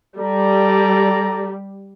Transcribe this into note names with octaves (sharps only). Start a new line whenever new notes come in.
G3 A4 D5 A#5